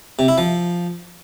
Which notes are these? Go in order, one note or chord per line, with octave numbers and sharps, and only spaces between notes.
C3
E4
F3